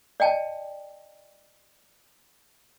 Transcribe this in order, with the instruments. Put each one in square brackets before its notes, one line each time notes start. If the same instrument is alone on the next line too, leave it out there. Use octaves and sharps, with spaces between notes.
[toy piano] D5 D#5 G5 A5